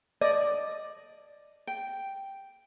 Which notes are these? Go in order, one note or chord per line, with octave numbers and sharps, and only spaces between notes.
D5 D#5
G5